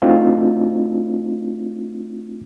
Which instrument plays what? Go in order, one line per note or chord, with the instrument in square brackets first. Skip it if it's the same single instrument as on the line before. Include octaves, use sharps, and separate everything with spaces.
[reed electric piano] A3 C4 D4 D#4 F4 F#4